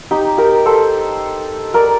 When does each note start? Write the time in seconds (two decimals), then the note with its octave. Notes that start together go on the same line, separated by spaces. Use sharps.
0.11 D#4 G4
0.38 G4 A#4
0.66 A4 C5
1.74 A#4 D5